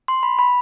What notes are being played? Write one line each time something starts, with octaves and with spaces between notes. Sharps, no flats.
C6
B5
B5